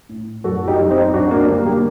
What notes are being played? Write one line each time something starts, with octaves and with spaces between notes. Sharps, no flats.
A2
F#2 F#4 A4
D#4 G4
F#2
C4 D#4
F#3 D4 F#4
A#3 D4
D3 G3 A#3
G3 A#3